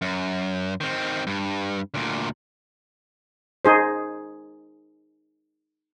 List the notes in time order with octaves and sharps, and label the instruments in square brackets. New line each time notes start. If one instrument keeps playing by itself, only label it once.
[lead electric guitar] F#2
D#3 C4
G2
D2 A#2
[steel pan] D#4 G#4 C5